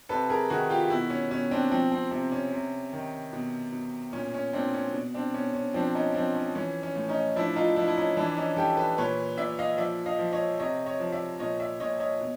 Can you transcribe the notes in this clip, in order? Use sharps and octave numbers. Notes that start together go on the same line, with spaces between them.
C3 A4 B4
G#4 A#4
D#3 F#4 G#4
F4 G4
B2 E4 F#4
C#4
B2 C#4
C4 D4
F3 C4
C4
C3 C4
C#4
C3
D#3
B2
B2
A#2 C#4
C#4
A#2 C4 D4
C#4
B2
C4 D4
B2 C#4
C#4
F3 C4 D4
C#4 D#4
F3 C4 D4
C#4
E3 C#4
C#4
A2
C#4 D#4
F3 D4 E4
D#4 F4
F3 D4 E4
E4
C#4 D#4
E3 D4 E4
C#4 D#4
E3 G4 A4
A4 B4
A#2 B4 C#5
A#2 D5 E5
D#5 F5
F3 D5 E5
D#5 F5
F3
C#5 D#5
C3 C#5 D#5
C#5 D#5
F3
D5 E5
A#2 C#5 D#5
D5 E5
A#2 C#5 D#5
C#5 D#5
B2